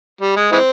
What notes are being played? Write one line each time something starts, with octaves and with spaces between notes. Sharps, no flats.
G3
G#3
E3 G#3 C4